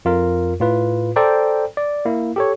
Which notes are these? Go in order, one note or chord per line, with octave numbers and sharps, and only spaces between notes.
F2 F4 A#4
A2 F4 B4
A4 C5 D5 G5 A#5
D5
A#3 E4
G4 A4 C#5